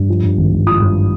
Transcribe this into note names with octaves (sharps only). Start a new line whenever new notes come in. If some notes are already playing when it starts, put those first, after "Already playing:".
Already playing: G2
F3
G2
G#1
G#1
F3 D#6
G2